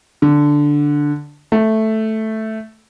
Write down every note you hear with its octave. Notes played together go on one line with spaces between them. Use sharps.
D3
A3